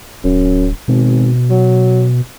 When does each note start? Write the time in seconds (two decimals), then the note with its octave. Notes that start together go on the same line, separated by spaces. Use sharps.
0.24 D1 F#2
0.88 G#1 B2
1.50 F#3